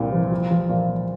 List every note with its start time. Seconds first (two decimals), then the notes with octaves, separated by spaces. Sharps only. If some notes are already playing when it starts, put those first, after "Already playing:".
Already playing: C2 A#2
0.12 F3
0.31 F4
0.50 F3
0.69 A#2
0.89 A#3